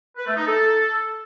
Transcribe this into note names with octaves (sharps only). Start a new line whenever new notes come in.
B4
A3
D#4
A4